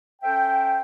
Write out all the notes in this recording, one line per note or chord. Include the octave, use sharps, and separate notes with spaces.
C#4 A4 C5 E5 G5